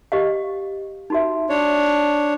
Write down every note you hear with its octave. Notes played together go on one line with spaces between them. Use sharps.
G4 D#5 F5
D#4 F#4 E5
D4 C#5